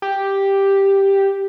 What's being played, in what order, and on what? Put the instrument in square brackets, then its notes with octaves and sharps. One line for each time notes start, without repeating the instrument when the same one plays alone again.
[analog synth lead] G4